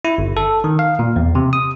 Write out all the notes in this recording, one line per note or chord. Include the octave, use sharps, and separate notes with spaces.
E4
G1
A4
D#3
F5
A#2
E2
C3
D#6